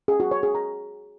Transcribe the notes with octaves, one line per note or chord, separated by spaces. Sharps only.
G#4
F#4
C#5
G#4
A#5